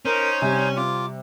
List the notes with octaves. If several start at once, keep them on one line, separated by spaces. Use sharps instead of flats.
C#4 D#4 A#4 C5
C3 G3 G#5
F4 D6